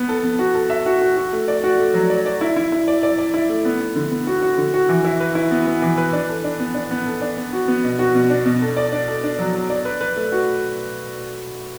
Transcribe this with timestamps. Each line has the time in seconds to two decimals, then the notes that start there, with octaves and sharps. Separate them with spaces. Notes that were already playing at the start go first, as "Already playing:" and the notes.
Already playing: B3
0.09 A4
0.24 B3
0.39 F#4
0.54 A4
0.70 E5
0.86 F#4
1.01 F#4
1.17 F#4
1.33 A3
1.48 D5
1.64 F#4
1.79 A3
1.94 F#3
2.10 D5
2.26 D5
2.41 E4
2.56 E4
2.72 E4
2.88 D5
3.03 D5
3.18 D5
3.34 E4
3.49 A3
3.65 B3
3.81 B3
3.96 D3
4.11 B3
4.27 F#4
4.42 F#4
4.58 D3
4.74 F#4
4.89 E3
5.05 E4
5.20 B4
5.35 E4
5.51 B3
5.67 B3
5.82 E3
5.98 B4
6.13 D4
6.29 A4
6.44 D4
6.60 B3
6.75 D4
6.91 B3
7.06 A4
7.21 D4
7.37 B3
7.53 F#4
7.68 B3
7.84 B2
7.99 F#4
8.15 B2
8.30 D4
8.46 B2
8.61 A4
8.76 D5
8.92 D4
9.07 A4
9.24 D4
9.39 F#3
9.54 F#3
9.70 D5
9.85 B4
10.01 B4
10.16 A3
10.32 F#4